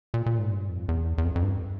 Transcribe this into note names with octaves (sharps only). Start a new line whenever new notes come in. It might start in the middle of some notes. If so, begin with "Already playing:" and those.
A#2
A#2
G#2
G2
F2
E2
E2
F2
F2
G2